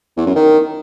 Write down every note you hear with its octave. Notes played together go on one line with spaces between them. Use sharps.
E2
F#2
D#3